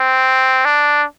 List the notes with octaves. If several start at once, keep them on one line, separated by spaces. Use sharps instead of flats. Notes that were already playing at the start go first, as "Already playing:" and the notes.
Already playing: C4
D4